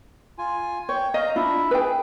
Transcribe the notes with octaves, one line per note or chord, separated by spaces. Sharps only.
F4 G#5
C#5 G5
D#5 F5 A#5
D4 E4 F4 E5
G#4 B4 G5